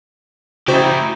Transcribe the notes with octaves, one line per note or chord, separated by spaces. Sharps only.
C#3 A3 D#4 E4 F#4 G4 C5